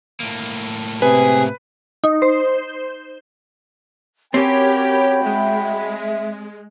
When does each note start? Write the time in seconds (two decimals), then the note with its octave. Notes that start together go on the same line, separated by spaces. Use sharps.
0.20 A2 A#3
1.02 C3 G#4 B4
2.04 D#4
2.22 C5
4.34 C4 C#4 F#4 G4 A#4 C#5 G5 B5
5.24 G#3 E5